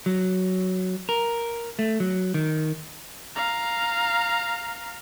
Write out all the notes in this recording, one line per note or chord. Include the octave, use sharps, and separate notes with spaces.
F#3
A#4
A3
F#3
D#3
F5 A#5